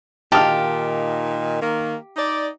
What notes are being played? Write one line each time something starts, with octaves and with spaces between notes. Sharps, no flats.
A#2 D#3 G4 F5 A5 F6
D#3 A#3
D#4 D5